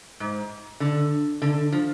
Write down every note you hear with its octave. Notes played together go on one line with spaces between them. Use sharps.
G#2
D3
D3
F3